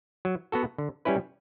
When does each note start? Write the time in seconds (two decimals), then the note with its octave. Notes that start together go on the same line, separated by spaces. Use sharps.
0.25 F#3
0.52 B3 F#4 A4
0.78 D3
1.05 G3 C#4 E4 B4